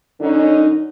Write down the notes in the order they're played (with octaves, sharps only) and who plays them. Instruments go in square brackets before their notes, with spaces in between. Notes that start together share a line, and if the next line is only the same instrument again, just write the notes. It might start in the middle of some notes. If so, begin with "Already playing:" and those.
[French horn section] F#2 D3 C#4 D#4